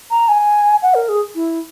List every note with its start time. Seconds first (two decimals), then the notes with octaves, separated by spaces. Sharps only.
0.11 A#5
0.28 G#5
0.82 F#5
0.95 A#4
1.09 G#4
1.35 E4